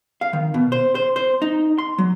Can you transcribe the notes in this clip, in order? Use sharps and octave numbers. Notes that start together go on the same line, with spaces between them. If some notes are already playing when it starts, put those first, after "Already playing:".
F5
D#3
B2
C5
C5
C5
D#4
C6
F#3